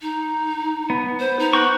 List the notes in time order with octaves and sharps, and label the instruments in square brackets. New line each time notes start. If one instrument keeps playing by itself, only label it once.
[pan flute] D#4
[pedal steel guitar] B3
[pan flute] C5
D#4
[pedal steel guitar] F#5 G5 C#6